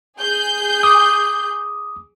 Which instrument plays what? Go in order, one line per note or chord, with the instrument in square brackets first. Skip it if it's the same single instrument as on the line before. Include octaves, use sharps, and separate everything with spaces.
[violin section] G#4 G6
[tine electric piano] D6 D#6